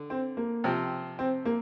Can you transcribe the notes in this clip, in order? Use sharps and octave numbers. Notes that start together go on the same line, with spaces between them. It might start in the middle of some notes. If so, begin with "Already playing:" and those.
Already playing: D3
C4
A#3
C3 F3 C4
C4
A#3